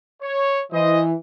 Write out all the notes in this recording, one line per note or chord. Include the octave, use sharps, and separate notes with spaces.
C#5
E3 C5 D#5